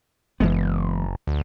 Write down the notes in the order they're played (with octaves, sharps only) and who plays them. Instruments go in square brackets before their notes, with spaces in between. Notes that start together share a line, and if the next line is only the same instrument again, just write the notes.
[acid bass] F#1 [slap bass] E3 G#3 B3
[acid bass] D2